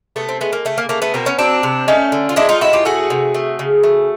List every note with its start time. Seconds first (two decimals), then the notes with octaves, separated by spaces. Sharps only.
0.16 C3 A3 B3
0.29 C4
0.41 G#3 A3 B3
0.53 A#3
0.65 C#3 A3
0.78 A#3
0.89 A3 A#3
1.02 A3 B3
1.14 B2 A#3 C4
1.26 B3 C#4
1.39 F#3 C4 D4
1.63 C3
1.88 A3 C#4 D#4
2.12 D3
2.29 F4
2.36 G#3 D4 E4
2.49 D#4 F4
2.61 A2 E4 F#4
2.73 F4 G4
2.85 A3 F#4 G#4
3.10 C3
3.34 A3
3.59 C#3
3.83 A3